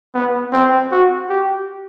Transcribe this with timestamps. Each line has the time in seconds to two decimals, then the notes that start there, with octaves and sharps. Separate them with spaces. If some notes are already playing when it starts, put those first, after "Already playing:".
0.14 B3
0.53 C4
0.91 F#4
1.29 G4